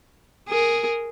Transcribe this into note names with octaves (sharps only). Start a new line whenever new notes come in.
G#4 A#4